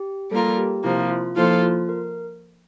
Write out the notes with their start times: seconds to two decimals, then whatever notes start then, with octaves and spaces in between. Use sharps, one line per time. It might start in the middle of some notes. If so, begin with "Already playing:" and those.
Already playing: G4
0.31 G3 A#3 F4 A4 A#4
0.58 G4
0.84 C3 F3 A#3 E4
1.10 F4
1.36 F3 A#3 E4 F4 A4 C5
1.63 F4
1.89 A#4